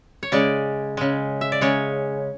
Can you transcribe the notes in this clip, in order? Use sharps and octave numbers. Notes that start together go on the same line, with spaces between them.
C#5
C#3 G#3 D5
C#3 G#3
E5
D5
C#3 G#3 C#5